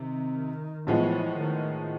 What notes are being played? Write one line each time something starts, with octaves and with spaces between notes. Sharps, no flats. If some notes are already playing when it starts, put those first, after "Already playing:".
Already playing: C3 D#3
A2 E3 F3 G#3 B3
D#3